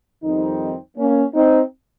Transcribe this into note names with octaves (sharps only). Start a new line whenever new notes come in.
F2 D#3 G3 C4 D#4
A#3 C#4
C4 D#4